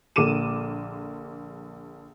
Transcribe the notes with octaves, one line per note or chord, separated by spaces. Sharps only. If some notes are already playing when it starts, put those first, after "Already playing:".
A#1 D3 A#3 D6 D#7 E7